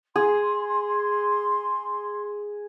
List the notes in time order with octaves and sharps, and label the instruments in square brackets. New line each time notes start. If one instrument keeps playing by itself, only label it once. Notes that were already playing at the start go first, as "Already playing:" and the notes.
[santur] G#4 [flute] C6